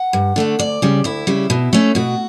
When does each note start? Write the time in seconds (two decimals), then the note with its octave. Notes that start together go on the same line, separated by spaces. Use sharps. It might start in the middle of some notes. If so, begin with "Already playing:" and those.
Already playing: F#5
0.13 G2
0.36 D3 A3 D4
0.59 D2 D5
0.82 C#3 G3
1.04 D2 E4
1.27 C#3 G3
1.50 B2
1.73 A3 C#4
1.95 B2 F#4